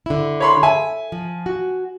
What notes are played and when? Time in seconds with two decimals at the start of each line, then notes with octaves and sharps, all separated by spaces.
0.06 D3 E4
0.40 C#5 B5 C6
0.63 E5 G#5
1.12 F3
1.46 F#4